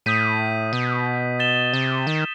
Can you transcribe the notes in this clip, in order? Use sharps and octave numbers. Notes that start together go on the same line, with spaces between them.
A2 D#6 G6 B6 D#7
B2
A6 E7 G7
C3
D#3